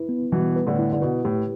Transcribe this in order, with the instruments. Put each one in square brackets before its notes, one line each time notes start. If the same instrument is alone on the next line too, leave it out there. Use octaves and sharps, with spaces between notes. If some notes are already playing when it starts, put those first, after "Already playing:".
Already playing: [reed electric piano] E4 B4
B3
[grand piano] B2 E3 [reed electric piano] G3
[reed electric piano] B4
[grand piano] A2 D3
[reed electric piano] E4
[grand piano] D3
[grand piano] B2 [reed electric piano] B4
[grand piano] A2 [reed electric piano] G4